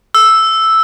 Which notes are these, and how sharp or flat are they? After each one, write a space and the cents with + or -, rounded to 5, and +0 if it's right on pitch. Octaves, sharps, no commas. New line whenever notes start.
E6 +0